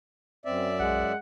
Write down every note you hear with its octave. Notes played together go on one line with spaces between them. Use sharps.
F#2 C4 D5 E5
B1 G#3 F#5